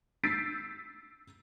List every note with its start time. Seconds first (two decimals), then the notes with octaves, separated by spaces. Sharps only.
0.24 E6 G6 A6 B6 C7 D7